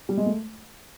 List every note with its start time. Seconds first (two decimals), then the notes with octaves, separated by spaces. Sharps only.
0.09 G3
0.17 G#3
0.26 A3